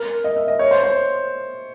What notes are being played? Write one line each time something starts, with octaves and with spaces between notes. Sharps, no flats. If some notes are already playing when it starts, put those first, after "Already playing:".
Already playing: A#4
D#5
E5
D#5
C#5
C5
C5